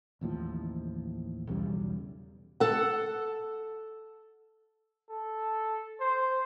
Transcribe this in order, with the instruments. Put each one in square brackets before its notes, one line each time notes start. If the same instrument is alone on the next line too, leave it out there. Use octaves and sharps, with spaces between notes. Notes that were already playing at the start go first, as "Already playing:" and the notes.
[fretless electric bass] A1 D#2 A2 F3
B1 E2 C#3 G3
[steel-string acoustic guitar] A4 F#5
[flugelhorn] A4
C5